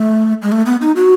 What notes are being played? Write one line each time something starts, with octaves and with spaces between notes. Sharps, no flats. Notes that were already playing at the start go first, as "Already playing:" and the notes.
Already playing: A3
G#3
A3
B3
D#4
F#4